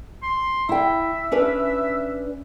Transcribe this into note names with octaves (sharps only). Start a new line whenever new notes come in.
C6
E4 E5 G5
C#4 D4 B4